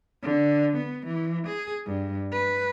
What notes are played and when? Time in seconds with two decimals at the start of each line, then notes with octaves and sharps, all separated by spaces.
0.23 D3
0.76 B3
1.07 E3
1.47 G#4
1.86 G2
2.32 B4